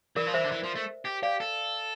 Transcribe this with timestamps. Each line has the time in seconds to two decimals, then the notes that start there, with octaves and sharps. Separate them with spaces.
0.16 E3 A#4 D5
0.27 F3
0.34 E3 C5 E5
0.44 D3
0.51 E3
0.63 F3
0.75 A3
1.05 G4
1.23 G4 D5 F5
1.40 A4